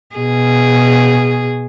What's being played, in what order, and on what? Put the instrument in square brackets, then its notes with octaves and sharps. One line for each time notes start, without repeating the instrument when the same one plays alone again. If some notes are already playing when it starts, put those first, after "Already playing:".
[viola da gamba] B2 G#4